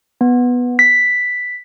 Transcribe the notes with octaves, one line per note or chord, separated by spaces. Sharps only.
B3
B6